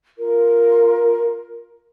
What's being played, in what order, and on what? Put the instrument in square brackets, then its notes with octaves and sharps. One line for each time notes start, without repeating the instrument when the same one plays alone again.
[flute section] F4 A#4